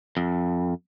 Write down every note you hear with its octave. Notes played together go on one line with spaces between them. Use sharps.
F2